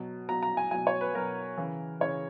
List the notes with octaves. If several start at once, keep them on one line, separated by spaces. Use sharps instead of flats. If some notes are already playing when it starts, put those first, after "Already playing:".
Already playing: B2 F#3
B2 F#3 A#5
A#5
G#5
B2 F#3 G#5
C#5
B4
B2 F#3 A#4
C#3 E3
C#3 E3 C#5